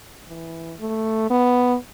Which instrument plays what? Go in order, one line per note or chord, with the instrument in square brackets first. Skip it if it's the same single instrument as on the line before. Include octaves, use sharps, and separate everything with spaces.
[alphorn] E3
A3
B3